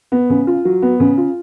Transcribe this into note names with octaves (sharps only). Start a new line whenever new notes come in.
B3
C#3
F4
F#3
B3
C#3
F4